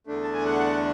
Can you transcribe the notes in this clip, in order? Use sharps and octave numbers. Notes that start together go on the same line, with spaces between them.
E2 D3 A3 D4
A5
G#5
F#5